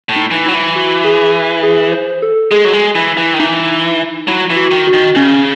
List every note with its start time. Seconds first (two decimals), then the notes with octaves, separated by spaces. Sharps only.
0.09 A2
0.16 D#4
0.31 E3
0.46 F#3 E4
0.54 E3
0.76 F#4
1.04 G#4
1.63 G#4
1.92 C5
2.22 A4
2.51 G#3 G#4
2.65 F#3
2.73 G#3
2.95 E3 E4
3.17 E3
3.34 D#3
3.39 E3 D#4
4.28 F#3 E4
4.50 E3
4.56 F#4
4.71 D#3
4.87 F#4
4.93 D#3
5.15 C#3 C#4